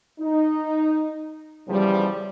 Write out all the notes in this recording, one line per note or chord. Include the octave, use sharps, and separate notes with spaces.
D#4
E2 C#3 F3 G3